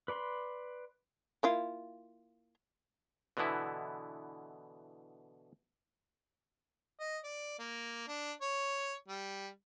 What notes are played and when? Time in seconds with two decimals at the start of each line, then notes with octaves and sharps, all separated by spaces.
0.08 B4 D5 B5 C6
1.43 A#3 E4 F4
3.37 B2 D3 E3 B3 E4
7.00 D#5
7.24 D5
7.59 A#3
8.08 D4
8.41 C#5
9.08 G3